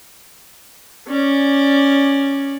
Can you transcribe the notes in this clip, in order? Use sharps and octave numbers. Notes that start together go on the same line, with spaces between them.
C#4 D5